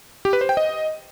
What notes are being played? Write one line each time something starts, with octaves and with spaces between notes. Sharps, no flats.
G4
B4
C5
G5
D#5